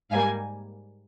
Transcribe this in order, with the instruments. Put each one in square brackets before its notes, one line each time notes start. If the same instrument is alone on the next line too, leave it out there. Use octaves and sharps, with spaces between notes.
[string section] G#2 G3 A#3 F5 G#5